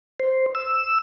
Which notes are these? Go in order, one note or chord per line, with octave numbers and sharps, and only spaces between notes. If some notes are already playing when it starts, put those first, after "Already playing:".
C5
E6